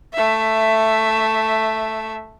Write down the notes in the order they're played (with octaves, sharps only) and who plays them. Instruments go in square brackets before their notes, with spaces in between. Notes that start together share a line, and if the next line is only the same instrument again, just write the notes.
[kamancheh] A3 E5